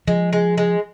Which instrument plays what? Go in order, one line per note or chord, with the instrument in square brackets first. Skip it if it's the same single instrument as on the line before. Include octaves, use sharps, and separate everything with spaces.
[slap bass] F3 [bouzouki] G#3
[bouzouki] G#3
G#3